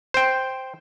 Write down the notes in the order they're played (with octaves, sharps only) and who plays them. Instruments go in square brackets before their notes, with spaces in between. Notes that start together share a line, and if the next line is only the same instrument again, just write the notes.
[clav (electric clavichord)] C5 G5